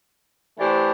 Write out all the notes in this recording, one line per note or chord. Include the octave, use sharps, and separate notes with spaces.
E3 A3 D4 G4 C5